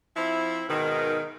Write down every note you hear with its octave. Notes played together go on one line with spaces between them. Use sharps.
F3 C4 E4
G#2 B2 D#3